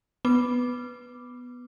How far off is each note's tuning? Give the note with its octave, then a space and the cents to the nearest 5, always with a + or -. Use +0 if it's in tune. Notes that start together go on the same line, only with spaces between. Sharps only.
B3 +0 D6 +0